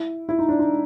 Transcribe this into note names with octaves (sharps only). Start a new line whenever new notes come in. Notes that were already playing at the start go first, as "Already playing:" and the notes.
Already playing: E4
E4
D#4
D4
D#4